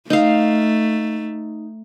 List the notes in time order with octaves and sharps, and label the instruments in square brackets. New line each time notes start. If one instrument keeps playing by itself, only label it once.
[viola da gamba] A3 [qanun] D#4 F5